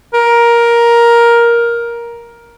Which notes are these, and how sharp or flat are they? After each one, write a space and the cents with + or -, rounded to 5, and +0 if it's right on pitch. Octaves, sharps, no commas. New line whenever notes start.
A#4 +10